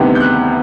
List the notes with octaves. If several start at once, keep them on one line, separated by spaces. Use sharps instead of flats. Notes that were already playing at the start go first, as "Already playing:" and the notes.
Already playing: D2 C3 D#3 G3 B3
G6
F#6